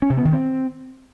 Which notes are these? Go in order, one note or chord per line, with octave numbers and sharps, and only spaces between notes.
C#4
C3
B3
D#3
C4